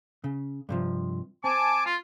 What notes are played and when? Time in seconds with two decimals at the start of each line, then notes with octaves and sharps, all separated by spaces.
0.24 C#3
0.69 G2 C3 F3
1.44 C4 G#5 A5 D6
1.86 F4